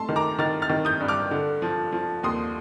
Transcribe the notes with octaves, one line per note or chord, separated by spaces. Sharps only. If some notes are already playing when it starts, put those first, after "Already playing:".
Already playing: A3 A5 C6
D#3
A#5 D6
D#3 F6 A6
F6 A6
D#3
D#6 G6
G2
D6 F6
D3
F3
F3
D#2 C6 D#6